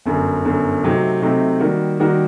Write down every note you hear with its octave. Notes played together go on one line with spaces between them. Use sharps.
G1 F#2 D3
G1 F#2 D3
C3 F#3 A3 C4 D#4
C3 F#3 A3 C4 D#4
D#3 G3 A#3 F#4 A#4
D#3 G3 A#3 F#4 A#4